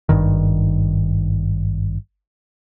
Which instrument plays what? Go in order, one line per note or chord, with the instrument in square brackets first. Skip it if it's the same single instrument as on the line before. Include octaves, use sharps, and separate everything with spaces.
[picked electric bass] G#1 G2 D#3